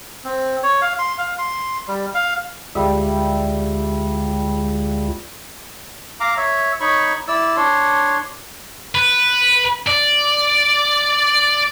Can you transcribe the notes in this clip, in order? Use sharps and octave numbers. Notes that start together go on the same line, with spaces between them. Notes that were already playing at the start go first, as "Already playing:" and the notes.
C4
C#5
F5
C6
F5
C6
G3
F5
D2 G3 G#3 F4 E5
F5 A#5 D6
C#5 E5
D#4 C#5 B5 C#6
E4 D5 E6
D4 C#5 C6
B4
D5